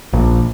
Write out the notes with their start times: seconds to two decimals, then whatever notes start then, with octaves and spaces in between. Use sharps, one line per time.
0.13 A#1